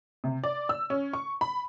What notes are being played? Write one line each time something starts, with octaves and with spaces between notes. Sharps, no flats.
C3
D5
E6
C#4
C#6
B5